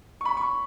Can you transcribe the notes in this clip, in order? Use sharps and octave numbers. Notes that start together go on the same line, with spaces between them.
C#6
B5
C#6